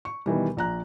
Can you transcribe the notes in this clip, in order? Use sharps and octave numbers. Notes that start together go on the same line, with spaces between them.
C#6
B2 D#3 E3 G3
A#1 A#5 F#6